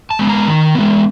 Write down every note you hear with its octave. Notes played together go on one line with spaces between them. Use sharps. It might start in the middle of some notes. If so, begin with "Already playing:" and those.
A5
G#3 B3
A#5
D#3
G#3 B3